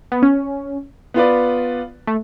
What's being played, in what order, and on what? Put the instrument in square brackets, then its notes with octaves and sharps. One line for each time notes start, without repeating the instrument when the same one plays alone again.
[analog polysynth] B3
C#4
[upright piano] B3 F4 B4 D5
[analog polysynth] A3